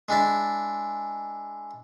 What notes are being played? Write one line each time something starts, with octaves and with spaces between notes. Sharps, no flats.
G#3 D4 E4 A5